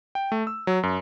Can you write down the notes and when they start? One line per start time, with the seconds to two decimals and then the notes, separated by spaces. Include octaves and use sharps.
0.15 G5
0.32 A3
0.47 E6
0.67 F#3
0.83 F#2